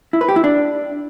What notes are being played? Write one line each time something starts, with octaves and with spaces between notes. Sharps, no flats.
E4
B4
G4
E4
D4